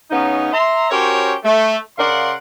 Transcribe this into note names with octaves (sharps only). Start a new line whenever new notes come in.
C#3 B3 C#4 D#4
E5 A#5 C6
C#4 F#4 G4 A#4 C5 C#5
A3
C#3 A#4 D5 F5 F#5 C6